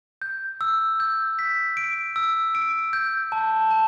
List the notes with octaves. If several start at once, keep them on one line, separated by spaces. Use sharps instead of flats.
G6
E6
G6
B6
D7
E6
D7
G6
A5
A5